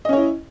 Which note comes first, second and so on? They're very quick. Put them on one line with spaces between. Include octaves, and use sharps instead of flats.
D#5 C#4 C#5 E4